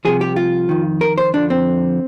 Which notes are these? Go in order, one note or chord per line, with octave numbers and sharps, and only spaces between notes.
C2 C3 F3 G#4
G4
F4
F2 D#3
A#4
C5
F2 D3 F3 D4
C4